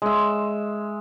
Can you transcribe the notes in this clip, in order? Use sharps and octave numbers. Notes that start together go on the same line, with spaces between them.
G#3 E5